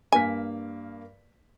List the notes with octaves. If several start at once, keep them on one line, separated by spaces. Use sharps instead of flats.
G2 A#3 G#5 B6